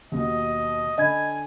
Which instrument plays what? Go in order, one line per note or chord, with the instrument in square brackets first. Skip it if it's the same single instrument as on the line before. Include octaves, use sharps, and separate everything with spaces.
[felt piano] D#2 B2 [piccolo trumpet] D#5
[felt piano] D3 B5 [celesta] D#5 G#6 [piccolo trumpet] G#5